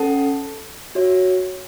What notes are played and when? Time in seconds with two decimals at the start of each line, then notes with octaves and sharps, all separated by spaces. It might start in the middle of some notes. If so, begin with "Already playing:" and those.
Already playing: C#4 A4 F#5 A5
0.95 F#4 C#5 E5